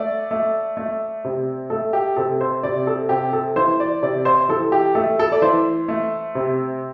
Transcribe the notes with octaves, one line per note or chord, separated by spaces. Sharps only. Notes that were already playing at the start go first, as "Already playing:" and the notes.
Already playing: A3 D5
A3
A3
C3
A3 A4
G4
C3 A4
C5
C3 D5
A4
C3 G4
A4
E3 C5
D5
C3 D5
C5
E3 A4
G4
A3 A4
A4
D5
E3 C5
A3
C3